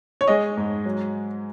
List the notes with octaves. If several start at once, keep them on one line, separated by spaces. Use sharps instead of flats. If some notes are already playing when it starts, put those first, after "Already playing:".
C#5
G#3 D#5
G#2
F#3